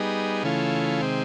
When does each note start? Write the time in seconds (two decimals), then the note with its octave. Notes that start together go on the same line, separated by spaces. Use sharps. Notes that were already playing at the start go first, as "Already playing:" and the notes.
Already playing: G3 B3 D#4 G#4
0.43 C#3 E3 A3 C#4 F4
1.01 C3 D#3 G#3 C4